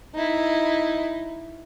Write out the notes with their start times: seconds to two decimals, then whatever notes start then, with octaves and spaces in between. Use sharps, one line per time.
0.14 D#4 E4